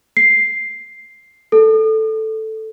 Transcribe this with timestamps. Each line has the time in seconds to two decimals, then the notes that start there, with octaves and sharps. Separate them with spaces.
0.17 C7
1.52 A4